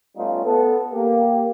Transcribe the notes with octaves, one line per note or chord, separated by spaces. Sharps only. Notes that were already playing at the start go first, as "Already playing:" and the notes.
G3 A3 B3 C#4 D#4 F4
B3 A4
A#3 G4